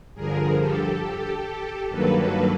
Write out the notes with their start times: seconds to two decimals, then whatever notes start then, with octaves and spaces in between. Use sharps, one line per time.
0.15 G2 D3 F3 G#4 A#4
0.59 G4 A4
1.02 G4 A4
1.89 G2 D#3 F#3 A#3 A4 B4
2.18 A4 B4